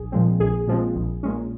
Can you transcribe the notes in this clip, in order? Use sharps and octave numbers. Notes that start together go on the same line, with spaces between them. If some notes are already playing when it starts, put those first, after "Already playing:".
Already playing: A#1 G#4
A#2 F3 G#3 C4
A#1 G#4
A#2 F3 G#3 C4
A#1
A#2 G#3 C#4